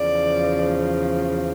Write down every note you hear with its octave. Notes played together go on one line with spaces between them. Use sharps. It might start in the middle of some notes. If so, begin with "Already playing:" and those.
Already playing: E2 C#3 F3 D5